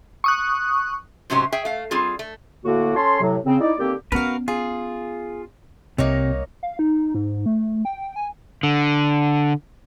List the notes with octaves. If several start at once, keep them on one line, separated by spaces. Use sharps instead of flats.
C#6 D#6 F#6
G#2 C3 F#3 C#4 G4 C5
G#4 E5 G5
A3 F5
G3 C4 F4 G#4
A3
A2 D3 A#3 F#4
C#4 A4 C#5 A5 C6
A2 C3 F#3
C#3 C4
D#4 E4 D5
D3 D#3 A#3 C4 G4
B3 C#4 F#4 A#4 B4 F5
F4 G#4
C2 C3 A#3 D#4 C#5
F5
D#4
G#2
A3
G5
G#5
D3